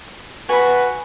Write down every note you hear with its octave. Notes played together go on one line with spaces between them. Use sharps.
F#4 B4 G#5 B5